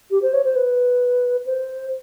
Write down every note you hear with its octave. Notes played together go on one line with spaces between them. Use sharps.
G4
C5
C#5
C5
B4
C5